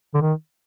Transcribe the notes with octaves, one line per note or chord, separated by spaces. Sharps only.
D3
D#3